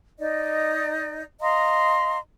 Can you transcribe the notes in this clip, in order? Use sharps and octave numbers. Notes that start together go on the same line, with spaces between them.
D#4 D5 D#5
D#5 F5 A#5 C6